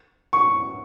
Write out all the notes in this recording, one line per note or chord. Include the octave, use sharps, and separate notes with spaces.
C#6